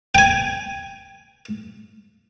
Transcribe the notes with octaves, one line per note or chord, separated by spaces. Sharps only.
G5 G#5